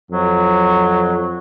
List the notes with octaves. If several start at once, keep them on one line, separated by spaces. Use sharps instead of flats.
F2 F#3